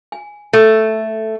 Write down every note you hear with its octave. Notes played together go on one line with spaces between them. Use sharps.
G#5
A3 A4